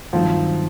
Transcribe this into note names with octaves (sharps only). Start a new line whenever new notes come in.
G2 D#3 F3 F#3 A3 C4